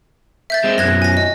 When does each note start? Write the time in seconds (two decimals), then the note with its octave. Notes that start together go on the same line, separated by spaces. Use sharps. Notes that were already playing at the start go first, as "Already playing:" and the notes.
0.50 E5 G6 A6
0.64 G#3 C4
0.78 F#2 B2 F#6 G#6 A#6
1.02 G#5 A#6
1.17 D#5